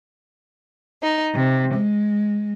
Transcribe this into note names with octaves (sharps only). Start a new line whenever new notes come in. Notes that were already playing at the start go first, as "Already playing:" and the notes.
D#4
C3
G#3